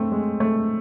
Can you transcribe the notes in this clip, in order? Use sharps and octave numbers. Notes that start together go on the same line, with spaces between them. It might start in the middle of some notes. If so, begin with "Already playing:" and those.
Already playing: A3 C4
G#3
A3